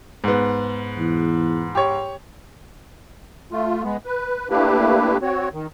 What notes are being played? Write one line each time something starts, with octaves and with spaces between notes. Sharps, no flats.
G#2 B3
E2
G4 C#5
A3 F4
G#3 B3
B4
A3 A#3 D4 E4 G4 B4
C4 F#4 C#5
D#3